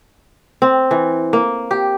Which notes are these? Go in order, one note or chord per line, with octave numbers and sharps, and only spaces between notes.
C4
E3
A#3
G4